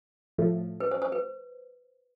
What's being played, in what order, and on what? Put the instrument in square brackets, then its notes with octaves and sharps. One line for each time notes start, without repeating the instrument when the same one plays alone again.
[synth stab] A2 F3 A3
[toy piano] B4
C5
C5
B4